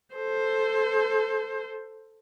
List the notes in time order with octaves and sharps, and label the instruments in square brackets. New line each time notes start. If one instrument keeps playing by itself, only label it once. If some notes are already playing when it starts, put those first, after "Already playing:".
[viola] A4 C5